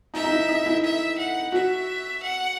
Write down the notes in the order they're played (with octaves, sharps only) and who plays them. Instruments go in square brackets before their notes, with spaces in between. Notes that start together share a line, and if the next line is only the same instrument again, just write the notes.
[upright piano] D#4 [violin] E5
[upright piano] D#4
E4
D#4
E4
[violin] E5
F#5
[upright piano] F#4 [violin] E5
[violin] F#5